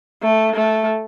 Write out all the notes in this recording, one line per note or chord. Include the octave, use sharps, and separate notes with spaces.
A3
A3